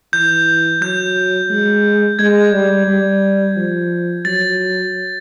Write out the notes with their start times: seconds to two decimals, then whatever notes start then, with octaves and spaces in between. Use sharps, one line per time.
0.13 E3 G6
0.81 F#3 G6
1.50 G#3
2.19 G#3 G#6
2.52 G3
2.88 G3
3.57 F3
4.25 F#3 A6